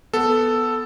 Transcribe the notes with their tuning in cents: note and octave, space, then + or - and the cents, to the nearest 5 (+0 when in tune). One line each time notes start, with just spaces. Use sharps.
B3 +0 A4 +0